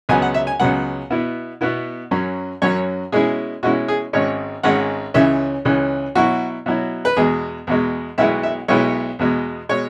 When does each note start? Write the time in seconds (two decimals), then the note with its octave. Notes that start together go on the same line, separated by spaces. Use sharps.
0.09 C#2 C#3 F#3 B3 G#5
0.22 F#5
0.34 E5
0.47 G#5
0.60 C#2 C#3 F#3 B3 F#5
1.10 B2 B3 E4
1.61 B2 B3 E4
2.11 F#2 F#3 C#4
2.62 F#2 F#3 C#4 C#5
3.12 B2 G#3 C#4 E4 G#4
3.63 B2 G#3 C#4 E4 F#4
3.88 G#4
4.13 G#1 G#2 G#3 C#4 C#5
4.63 G#1 G#2 G#3 C#4 F#5
5.14 C#2 C#3 E3 C#4 E5
5.65 C#2 C#3 E3 C#4
6.15 B2 F#3 E4 F#4
6.66 B2 F#3 E4
7.05 B4
7.16 E2 B2 G#3 G#4
7.67 E2 B2 G#3
8.18 B1 B2 G#3 B3 E4 E5
8.43 E5
8.68 B1 B2 G#3 B3 E4 C#5
9.19 E2 B2 G#3
9.69 B2 G#3 C#5